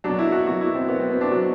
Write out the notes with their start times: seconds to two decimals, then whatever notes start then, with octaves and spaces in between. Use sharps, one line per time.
0.04 B2 F#3 D4
0.19 E4
0.32 F#4
0.47 B2 F#3 F#4
0.61 E4
0.75 C4
0.89 B2 F#3 B3
1.00 C4
1.11 C4
1.21 D4
1.31 B2 F#3 F#4